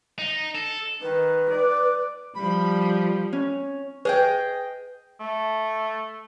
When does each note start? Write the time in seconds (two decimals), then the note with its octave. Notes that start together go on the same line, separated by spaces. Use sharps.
0.19 D#4
0.55 A4
1.02 D#3 B4
1.50 D5
2.35 F3 G3 B5
3.33 C#4
4.05 G#4 B4 D#5 G5
5.20 A3